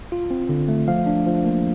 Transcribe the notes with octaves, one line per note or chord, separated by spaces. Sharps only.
F4
C4
D3
A3
F3 F5
D4
F3
A#3